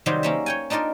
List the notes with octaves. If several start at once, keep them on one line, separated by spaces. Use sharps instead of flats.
C3 D#3 F#3 G3 C4 G4
A#3 C#4 E5
C#5 G5 G#5
D4 D#4 F4 A#4 D5